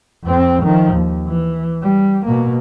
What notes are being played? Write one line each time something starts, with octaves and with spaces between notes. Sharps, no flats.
F2 C4
D#3 F3
D#2
E3
G3
B2 A#3